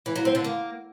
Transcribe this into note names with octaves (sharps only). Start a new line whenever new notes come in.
E3
F#3
C4
D3
A#3